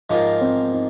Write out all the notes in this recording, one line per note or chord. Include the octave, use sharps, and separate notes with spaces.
G#2 F3 A#3 D#4 F4 A#4
C4
D#4